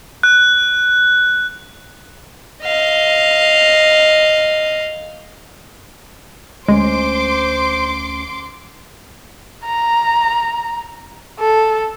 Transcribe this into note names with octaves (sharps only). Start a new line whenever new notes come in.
F#6
D#5 F5
D2 G#3 C#4 C5 C6 D6
A#5
A4